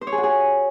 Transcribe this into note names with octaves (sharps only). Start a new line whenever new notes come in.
C5
C#5
G#4
F#4
G#4